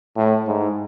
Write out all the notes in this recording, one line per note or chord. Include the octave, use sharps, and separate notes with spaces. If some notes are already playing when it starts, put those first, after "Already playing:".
A2
G#2